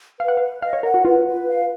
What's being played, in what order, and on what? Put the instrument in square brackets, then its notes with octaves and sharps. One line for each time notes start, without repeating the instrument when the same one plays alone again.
[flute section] B4 [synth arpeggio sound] F5
[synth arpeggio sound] F#5
[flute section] B4 [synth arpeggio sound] F5
[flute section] D#5 [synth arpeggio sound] F5
[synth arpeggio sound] C#5
[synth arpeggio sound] A#4 [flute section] F#5
[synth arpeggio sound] F#4
[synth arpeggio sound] F4 [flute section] B4
[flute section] B4
F5